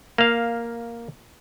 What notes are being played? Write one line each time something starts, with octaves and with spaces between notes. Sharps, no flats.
A#3 F5